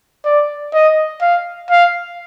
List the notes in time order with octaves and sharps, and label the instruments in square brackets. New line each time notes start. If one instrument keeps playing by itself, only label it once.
[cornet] D5
D#5
F5
F5